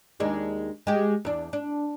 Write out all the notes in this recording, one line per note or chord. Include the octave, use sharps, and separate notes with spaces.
D#2 G#3 D4
G#3 G4
E2 D4
D4